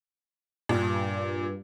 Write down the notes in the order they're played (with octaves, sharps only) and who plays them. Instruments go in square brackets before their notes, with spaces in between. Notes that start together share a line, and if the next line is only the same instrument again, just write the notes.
[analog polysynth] G2 [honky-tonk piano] A#2